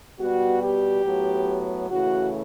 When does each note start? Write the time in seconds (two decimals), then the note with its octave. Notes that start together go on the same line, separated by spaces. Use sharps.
0.20 B2 G3 B3 F#4
0.63 G4
1.05 A2 F#3 B3
1.90 C#3 E3 A3 F#4